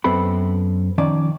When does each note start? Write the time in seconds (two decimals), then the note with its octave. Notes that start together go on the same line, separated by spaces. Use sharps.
0.04 F#2 B3 C4 A4 B5
0.98 D#3 F3 C#4 D5 A5